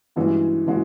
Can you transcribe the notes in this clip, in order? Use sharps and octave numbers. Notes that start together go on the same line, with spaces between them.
G2 E3 G#3 C#4 F#4
E3 G#3 C#4 F#4